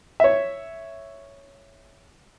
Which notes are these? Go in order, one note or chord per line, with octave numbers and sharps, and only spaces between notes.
C#5 E5